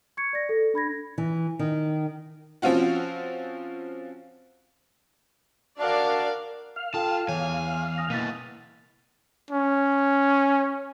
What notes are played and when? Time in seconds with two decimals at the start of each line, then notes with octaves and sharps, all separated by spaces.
0.17 C#6 G#6 C#7
0.33 D5 A#6
0.49 A4
0.74 D4 B5 G#6 A#6
1.18 E3
1.59 D#3
2.62 F3 C4 C#4 F4 F#4
5.80 D4 F#4 A#4 D5 F5 A5
6.76 F5
6.94 F4 A4 G5 A5
7.29 E2 E3 C#5 G#5
7.98 G#5 D#6 A#6
8.10 B2 A#3 E4 A6 B6 D#7
9.50 C#4